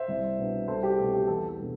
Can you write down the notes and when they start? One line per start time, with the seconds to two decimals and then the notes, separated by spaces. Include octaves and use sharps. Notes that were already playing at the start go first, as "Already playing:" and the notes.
Already playing: C5 E5
0.08 C2
0.38 B2 B3 D4
0.68 C2 A4 C5
0.83 G4
0.98 B2 A3 C4 A4
1.13 G4
1.27 E2 A4
1.48 A4
1.58 B2 G3 B3 D4